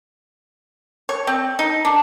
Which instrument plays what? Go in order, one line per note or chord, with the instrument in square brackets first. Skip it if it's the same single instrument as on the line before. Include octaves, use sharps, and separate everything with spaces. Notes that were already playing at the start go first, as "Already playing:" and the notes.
[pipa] C#5
C4
D#4
D4